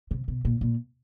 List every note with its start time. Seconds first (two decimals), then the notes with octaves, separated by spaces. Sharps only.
0.11 C3
0.28 B2
0.45 A#2
0.61 A#2